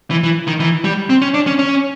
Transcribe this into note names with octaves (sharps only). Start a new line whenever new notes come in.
E3
E3
D#3
E3
G3
C4
C#4
D4
C#4
C#4